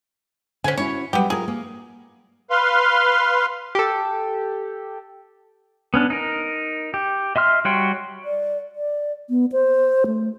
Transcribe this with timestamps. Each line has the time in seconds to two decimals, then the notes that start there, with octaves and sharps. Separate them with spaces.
0.64 D3 C#4 C5 G#5
0.77 C#4 E4 F#4 C#5
1.13 F#3 G3 B3 G4
1.30 F4 G#4 A#4
1.48 A#3
2.50 B4 F5 C6
3.75 G4 A4
5.94 B3 C#4 D4
6.10 D#4 A#4
6.94 G4
7.36 D#5 E5 C6 F6
7.65 G3 F#4 C#5 G5 C6
8.25 D5
8.76 D5
9.30 B3
9.52 C5
10.06 A3